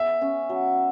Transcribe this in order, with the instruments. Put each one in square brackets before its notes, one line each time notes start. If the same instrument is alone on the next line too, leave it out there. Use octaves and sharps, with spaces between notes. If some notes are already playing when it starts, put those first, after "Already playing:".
Already playing: [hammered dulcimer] B3 D#4 G#4 [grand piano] E5
[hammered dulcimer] C#4
F#3